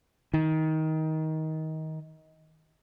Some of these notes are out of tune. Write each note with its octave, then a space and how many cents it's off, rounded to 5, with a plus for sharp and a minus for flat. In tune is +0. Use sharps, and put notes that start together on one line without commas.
D#3 +20